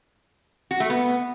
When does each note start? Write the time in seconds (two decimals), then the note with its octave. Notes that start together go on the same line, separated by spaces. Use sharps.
0.71 F#4
0.80 A3
0.90 B3